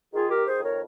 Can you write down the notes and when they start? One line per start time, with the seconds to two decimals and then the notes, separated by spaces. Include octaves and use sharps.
0.14 D#3 F4 G#4
0.30 G4 A#4
0.36 D#3
0.47 G#4 C5
0.58 F2
0.63 A#4 C#5